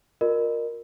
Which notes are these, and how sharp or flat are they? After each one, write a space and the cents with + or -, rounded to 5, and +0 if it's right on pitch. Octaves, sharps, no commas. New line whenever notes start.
F4 +35 A#4 +0 D#5 -35